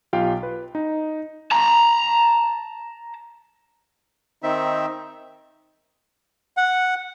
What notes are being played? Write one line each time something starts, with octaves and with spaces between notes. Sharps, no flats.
B1 F4 G4 F5 G5
B4
D#4
A5 A#5
D#3 C4 D#4 E5
F#5